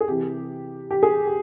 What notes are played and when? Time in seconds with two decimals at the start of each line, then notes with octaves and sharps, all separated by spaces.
0.01 G#4
0.08 C3 E3 G4
0.91 G4
1.03 G#4
1.27 G4